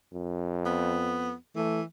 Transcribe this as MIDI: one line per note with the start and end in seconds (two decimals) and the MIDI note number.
0.13 1.35 41
0.65 1.33 59
1.56 1.83 52
1.56 1.81 57